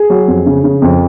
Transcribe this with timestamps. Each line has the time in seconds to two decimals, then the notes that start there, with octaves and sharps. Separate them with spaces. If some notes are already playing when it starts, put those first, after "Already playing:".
Already playing: G#4
0.10 F#3
0.28 F2
0.46 C#3
0.64 C#3
0.82 F2